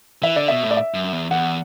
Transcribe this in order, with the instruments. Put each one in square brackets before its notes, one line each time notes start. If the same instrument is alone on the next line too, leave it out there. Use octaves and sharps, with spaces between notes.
[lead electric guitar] E3 [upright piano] E5
[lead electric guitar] D3 [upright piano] D5
[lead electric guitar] B2 [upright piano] E5
[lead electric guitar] A2
[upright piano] D5
E5
[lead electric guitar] F#2
E2
[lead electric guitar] E2 [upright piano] F#5